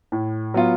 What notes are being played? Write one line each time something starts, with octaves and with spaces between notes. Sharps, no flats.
A2
F#3 B3 F4